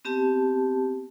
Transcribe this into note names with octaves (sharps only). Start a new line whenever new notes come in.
B3 C4 G4 A5